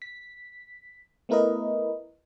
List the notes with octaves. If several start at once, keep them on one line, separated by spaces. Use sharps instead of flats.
B6
A3 B3 E4 A#4 B4 D#5